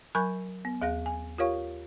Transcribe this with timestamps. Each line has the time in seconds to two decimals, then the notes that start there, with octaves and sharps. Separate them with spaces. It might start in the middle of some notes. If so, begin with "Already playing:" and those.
0.15 F#3 A#4 G#5 B5 C#6 G6
0.65 B3
0.82 D#2 G#4 F5 A#6
1.06 G#5
1.38 F4 G4 A#4 C#5 F5 C#6